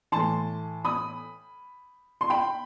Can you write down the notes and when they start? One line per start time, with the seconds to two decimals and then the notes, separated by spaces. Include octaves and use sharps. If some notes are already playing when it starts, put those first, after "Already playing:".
0.12 A2 E3 A5 C6
0.85 B5 D#6
2.21 C6
2.30 G5 B5